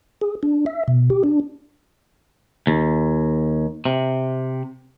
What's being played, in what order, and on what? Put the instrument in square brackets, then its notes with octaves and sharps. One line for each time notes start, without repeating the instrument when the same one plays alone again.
[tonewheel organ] G#4
D4
E5
B2
G4
D4
[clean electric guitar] D#2
C3